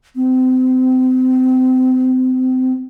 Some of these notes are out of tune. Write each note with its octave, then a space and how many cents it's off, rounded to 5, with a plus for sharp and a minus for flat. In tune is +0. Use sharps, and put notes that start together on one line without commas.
C4 -30